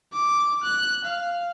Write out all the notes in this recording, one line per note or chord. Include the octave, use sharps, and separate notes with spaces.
D6
F#6
F5